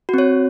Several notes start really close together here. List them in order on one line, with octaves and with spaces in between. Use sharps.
F#4 C4 C#5